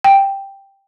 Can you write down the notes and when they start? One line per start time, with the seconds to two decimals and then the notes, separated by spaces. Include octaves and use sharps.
0.04 G5